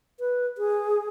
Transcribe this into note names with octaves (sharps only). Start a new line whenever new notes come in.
B4
G#4